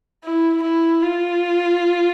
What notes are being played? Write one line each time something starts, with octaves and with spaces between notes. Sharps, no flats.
E4
E4
F4